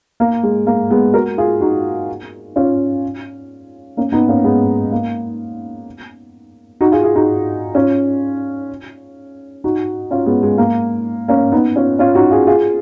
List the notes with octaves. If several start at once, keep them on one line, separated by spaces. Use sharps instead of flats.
A#3
G#3
A#3
G#3 B3
F#4 A#4
F4 G#4
D#4 F#4
C#4 F4
A#3 C#4
B3 D#4
A#3 C#4
G#3 B3
A#3
D#4 F#4
F4 G#4
F4 G#4
D#4 F#4
C#4 F4
D#4 F#4
C#4 F4
G#3 B3
G#3
A#3
A#3 C#4
B3 D#4
C#4 F4
C#4 F4
D#4 F#4
F4 G#4
F4 G#4